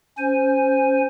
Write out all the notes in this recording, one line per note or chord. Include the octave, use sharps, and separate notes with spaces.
C#4 C5 G#5